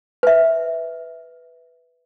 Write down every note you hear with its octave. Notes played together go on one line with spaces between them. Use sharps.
B4 E5